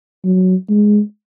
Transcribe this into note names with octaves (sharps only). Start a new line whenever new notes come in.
F#3
G#3